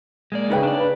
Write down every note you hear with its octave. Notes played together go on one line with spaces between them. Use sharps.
G#3 A#3 D5
C#3 D#4 B4 G5
D4 D5
B4